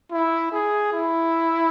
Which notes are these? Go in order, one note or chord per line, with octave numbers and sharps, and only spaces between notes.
E4
G#4
E4